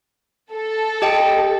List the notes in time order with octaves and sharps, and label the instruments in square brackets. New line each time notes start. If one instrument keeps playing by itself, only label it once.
[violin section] A4
[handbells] G4 D#5 G5